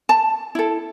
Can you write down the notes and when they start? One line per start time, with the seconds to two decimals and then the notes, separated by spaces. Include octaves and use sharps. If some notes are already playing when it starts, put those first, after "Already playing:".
0.09 A5
0.55 E4 A4